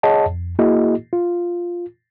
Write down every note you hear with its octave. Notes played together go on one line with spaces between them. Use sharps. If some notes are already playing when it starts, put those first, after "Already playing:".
G#4 C#5 D#5 F#5 A5
F2
A#3 E4 F#4 G#4 D#5
F4